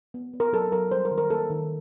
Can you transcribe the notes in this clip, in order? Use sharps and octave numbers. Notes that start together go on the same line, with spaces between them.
B3
B3
A#4
F#3 A4
F#3 A#4
G3 C5
A#4
D#3
A#4
A#3 A4
D#3